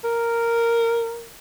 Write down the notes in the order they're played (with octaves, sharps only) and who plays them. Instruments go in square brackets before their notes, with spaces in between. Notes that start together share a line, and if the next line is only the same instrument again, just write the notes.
[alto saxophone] A#4